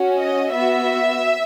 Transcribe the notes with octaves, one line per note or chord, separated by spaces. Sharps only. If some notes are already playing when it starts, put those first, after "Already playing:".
Already playing: C#4 F#4
D#5
B3 F#4 E5